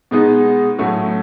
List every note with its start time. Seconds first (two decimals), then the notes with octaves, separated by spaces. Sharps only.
0.11 B2 G#3 B3 D#4
0.79 A2 F#3 A3 C#4 F#4